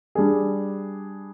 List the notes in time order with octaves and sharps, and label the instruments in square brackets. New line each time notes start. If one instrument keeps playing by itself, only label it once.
[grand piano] G3 D4 G#4